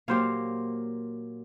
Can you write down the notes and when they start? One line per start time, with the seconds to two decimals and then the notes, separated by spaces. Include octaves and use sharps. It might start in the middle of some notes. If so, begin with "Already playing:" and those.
0.08 A#2 F#3 A#3 G4 C5 F5